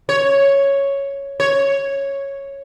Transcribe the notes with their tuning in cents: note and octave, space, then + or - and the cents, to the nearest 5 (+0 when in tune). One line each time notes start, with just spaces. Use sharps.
C#5 +0
C#5 -5